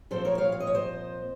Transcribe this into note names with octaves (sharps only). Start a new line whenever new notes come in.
A#2 F3 C4 A4 C5
A#4 C#5
C#5 F5
F5
D#5
C#5
C5 D#5